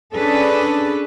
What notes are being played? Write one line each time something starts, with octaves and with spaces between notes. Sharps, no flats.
C#4 D4 G#4 A4 B4